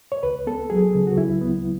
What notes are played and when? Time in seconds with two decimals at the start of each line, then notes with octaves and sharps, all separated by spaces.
0.12 C#5
0.23 C#2 B4
0.47 B3 A4
0.70 F#3 G#4
0.95 C#3
1.07 F#4
1.17 C#2 E4
1.41 B3